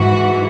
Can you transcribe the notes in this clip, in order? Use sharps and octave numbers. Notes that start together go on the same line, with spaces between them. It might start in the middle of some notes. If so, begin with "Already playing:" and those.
Already playing: G#2 E3 F#4